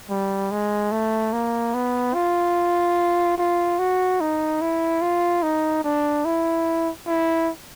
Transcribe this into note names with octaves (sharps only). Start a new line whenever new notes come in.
G3
G#3
A3
A#3
B3
F4
F4
F#4
D#4
E4
F4
D#4
D4
E4
E4